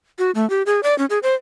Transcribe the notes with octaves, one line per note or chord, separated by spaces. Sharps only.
F#4
A3
G4
G#4
D5
C#4
G#4
C5